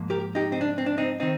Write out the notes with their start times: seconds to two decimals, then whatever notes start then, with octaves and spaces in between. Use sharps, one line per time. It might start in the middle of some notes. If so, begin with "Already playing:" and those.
Already playing: G#2 F3 A#3
0.10 G4 A#4
0.35 D#4 G4
0.52 C4 D#4
0.61 D4
0.78 C4
0.86 D4
0.98 C4 D#4
1.20 D#3 C4 D#4